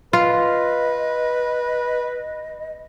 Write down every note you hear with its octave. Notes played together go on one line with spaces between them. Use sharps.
F4 B4 D#5